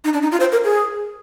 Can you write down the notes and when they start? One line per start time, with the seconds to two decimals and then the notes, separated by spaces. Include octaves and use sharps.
0.04 D#4
0.13 D4
0.22 D#4
0.32 F4
0.40 C5
0.52 A#4
0.64 G#4